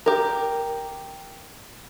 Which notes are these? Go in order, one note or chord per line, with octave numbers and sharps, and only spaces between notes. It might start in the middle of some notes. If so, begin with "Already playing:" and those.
G4 A#4